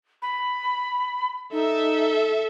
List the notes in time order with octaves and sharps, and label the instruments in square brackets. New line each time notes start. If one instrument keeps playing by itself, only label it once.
[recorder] B5
[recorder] D#4 [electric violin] A4 E5